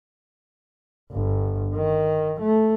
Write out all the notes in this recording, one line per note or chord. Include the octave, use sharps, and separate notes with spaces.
G1
D#3
A3